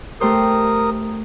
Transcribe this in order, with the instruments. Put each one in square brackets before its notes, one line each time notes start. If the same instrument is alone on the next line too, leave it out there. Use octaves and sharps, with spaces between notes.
[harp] A3 G4 C5 [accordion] A#4 D#6